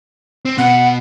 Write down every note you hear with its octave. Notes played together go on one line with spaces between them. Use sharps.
C4
B2 B3 F#5